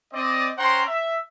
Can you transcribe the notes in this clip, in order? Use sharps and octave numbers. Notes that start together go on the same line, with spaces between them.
C4 D5 D#5
C#4 C5 F#5 G5 A#5 C6
E5